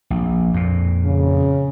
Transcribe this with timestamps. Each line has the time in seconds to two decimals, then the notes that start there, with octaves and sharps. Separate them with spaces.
0.10 A#1
0.53 F2 A#2
1.05 C#3